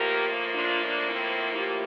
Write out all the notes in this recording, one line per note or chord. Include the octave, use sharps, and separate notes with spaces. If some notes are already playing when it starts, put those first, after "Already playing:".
Already playing: A2 F3 A#3 G4 A#4
D4 F4
D4
C4 E4
E4 G4